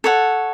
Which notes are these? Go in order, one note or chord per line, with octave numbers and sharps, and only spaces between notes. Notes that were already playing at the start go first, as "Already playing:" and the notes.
A4 C#5 F#5